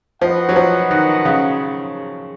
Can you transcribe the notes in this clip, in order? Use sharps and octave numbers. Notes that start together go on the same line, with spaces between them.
F3 F#4 B4 D#5 F#5
F#3
F3
D#3
C#3